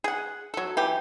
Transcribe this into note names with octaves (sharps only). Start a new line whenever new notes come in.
G#4 F#5
F#3 A4
E3 G4